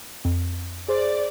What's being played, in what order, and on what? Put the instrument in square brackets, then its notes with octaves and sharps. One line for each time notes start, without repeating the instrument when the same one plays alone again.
[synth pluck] F2
[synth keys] G#4 C5 [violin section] D5